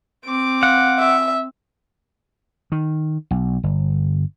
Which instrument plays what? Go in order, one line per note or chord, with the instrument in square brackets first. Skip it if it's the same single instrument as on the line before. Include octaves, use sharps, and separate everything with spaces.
[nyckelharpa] C4 D6
[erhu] F5 [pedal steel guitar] F#5
[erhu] E5
[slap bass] D#3
B1
G1